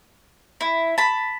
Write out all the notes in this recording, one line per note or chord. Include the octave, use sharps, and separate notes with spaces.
E4
A5 B5